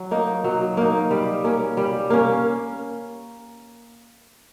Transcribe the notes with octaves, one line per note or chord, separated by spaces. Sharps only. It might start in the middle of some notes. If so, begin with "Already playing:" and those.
Already playing: F#3
A#3 D#4
F#3
A#3 D#4
G3
A#3 C#4
G3
A#3 C#4